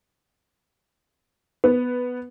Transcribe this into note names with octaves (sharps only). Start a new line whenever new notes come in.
B3